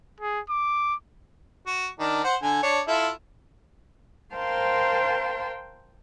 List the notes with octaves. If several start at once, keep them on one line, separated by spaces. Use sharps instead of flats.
G#4
D6
F#4
D#3 D4
C5 F#5
D3 G#5
D4 C#5
E4 F4 A4
A#4 C5 F5 G5 A5 C6